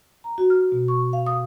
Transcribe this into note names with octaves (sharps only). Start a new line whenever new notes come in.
A#5
F#4
F6
B2
C#6
F5
D#6